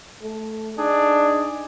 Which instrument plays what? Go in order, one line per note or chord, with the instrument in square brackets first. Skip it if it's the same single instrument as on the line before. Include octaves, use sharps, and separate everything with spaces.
[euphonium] A3
[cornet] D4 [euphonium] D#4 [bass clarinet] G#4